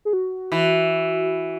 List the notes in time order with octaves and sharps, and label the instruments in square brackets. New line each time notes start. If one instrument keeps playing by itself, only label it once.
[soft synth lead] G#4
F#4
[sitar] E3